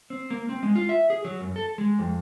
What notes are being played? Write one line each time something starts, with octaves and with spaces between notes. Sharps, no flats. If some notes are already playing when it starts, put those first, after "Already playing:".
C4
A#3
C4
G#3
F4
E5
G#4
F#3
F#2
A4
G#3
F2